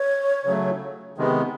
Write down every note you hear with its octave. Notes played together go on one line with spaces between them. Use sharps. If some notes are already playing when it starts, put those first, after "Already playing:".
Already playing: C#5
C#3 F#3 A3
C3 D#3 G#3 B3